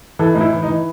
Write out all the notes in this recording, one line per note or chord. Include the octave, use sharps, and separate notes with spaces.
E3 A4
A2 D#4
E4
E3
D#4
E3